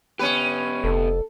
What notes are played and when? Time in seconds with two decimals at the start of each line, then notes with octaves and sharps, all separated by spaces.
0.19 B3 C#4 G4 B4
0.84 F1 A4